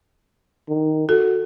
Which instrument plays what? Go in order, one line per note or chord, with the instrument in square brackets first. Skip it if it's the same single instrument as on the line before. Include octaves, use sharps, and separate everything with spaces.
[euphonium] D#3
[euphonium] F#4 [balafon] A4